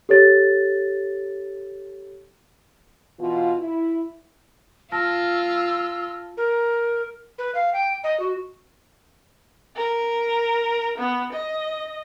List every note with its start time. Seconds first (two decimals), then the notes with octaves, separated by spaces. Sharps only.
0.09 G4 A4 C#5 A6
3.19 B2 E3 F4
3.58 E4
4.92 F4 A5 E6 F6 A#6
6.37 A#4
7.38 B4
7.55 F5
7.73 G5
8.04 D#5
8.20 F#4
9.76 A#4
10.98 B3
11.32 D#5